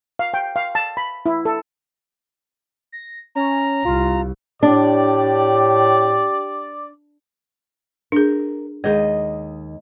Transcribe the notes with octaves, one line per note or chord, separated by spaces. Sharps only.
F5
G5
F5
A5
B5
E4
A4
A#6
C#4 A#5
C2 F4
A2 D4 G4 D5
D4 G#4 A#4
D#2 G#3 G#4 D#5